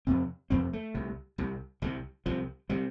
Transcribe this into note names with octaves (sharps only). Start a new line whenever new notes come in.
F2 C3 C4
F2 C3 C4
A3
C2 C3
C2 C3
C2 C3 G3
C2 C3 F3
C3 G3